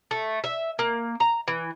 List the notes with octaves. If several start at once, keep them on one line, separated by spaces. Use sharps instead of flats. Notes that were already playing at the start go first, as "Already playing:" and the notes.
A3
E5
A#3
A#5
E3